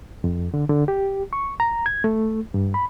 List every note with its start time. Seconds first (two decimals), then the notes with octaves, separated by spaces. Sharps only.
0.24 F2
0.54 D3
0.69 D3
0.88 G4
1.33 C#6
1.60 A#5
1.86 G#6
2.04 A3
2.54 G2
2.74 B5